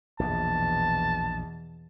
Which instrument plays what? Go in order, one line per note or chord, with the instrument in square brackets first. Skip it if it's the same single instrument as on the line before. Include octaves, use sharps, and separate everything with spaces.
[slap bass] A#1 [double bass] E2 B2 [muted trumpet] A5